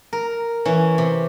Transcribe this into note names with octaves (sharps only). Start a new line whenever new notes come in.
A#4
E3 C#4
C3